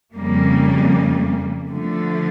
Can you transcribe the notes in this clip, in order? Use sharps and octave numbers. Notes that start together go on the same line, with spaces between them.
F2 C#3 G3 A#3
D3 F3 A3